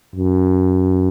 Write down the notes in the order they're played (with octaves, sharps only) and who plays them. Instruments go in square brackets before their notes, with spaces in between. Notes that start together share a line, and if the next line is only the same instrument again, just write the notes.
[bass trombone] F#2